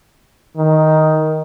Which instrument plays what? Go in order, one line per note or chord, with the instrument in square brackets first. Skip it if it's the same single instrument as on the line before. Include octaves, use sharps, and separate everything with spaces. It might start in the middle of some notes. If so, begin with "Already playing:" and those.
[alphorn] D#3